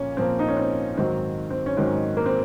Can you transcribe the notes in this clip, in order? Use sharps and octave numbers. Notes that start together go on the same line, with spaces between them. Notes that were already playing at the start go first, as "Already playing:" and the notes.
Already playing: A#2 F3 A#3 C#4
A#2 F3 A#3 C4
D#4
C#4
C4
G#2 D#3 F#3 C4
C4
C#4
G#2 D#3 F#3 C4
A#3
C4